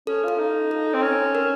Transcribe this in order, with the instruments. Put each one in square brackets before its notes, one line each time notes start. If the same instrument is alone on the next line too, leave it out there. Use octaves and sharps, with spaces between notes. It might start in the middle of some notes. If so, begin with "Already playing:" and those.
[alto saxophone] C#4 [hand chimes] A4
[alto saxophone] F4 [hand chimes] A4
[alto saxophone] D#4
[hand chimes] A4
[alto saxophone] C4
C#4
[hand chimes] A#4